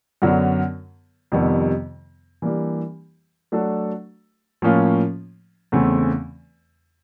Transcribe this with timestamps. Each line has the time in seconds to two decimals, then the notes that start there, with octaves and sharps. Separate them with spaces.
0.22 F#2 D3 F#3 B3
1.32 F2 C3 D#3 G3 B3
2.42 E3 G3 A#3 D4 G4
3.52 F#3 A3 D4 F#4 A4
4.62 A2 F3 A#3 C#4 F4
5.72 E2 C#3 E3 A3 C4